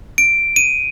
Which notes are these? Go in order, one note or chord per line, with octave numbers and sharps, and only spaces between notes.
D7
D#7